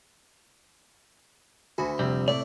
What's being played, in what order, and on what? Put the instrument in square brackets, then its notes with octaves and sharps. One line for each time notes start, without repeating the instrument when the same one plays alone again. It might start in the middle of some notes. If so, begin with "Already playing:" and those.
[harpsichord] D2 [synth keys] F#4 G#5 B5
[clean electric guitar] F2 G3 [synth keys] C3 C4
[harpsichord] A2 [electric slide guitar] D5